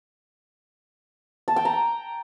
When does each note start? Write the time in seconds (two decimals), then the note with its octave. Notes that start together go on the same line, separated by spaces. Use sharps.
1.48 A5
1.56 G5
1.65 A#5